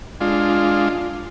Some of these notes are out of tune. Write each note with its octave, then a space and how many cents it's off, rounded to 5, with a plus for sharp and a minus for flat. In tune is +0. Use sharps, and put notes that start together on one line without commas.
G#3 +0 D4 +0 F4 +0